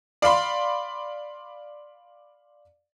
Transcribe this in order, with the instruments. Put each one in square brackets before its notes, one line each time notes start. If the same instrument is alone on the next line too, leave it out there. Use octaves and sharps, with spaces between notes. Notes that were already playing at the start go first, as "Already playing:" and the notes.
[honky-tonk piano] D5 F5 B5 C6